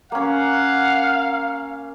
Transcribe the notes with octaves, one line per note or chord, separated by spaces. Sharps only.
A#3 C#4 F5 F#5